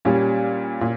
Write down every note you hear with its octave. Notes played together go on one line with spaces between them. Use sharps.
A#2 G3 C#4
A#2